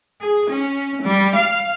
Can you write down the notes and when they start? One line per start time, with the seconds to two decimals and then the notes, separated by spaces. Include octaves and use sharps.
0.21 G#4
0.50 C#4
1.02 G3
1.35 F5